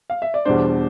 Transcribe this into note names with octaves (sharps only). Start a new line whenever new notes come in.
F5
E5
D5
E2 B2 G3 D4 C5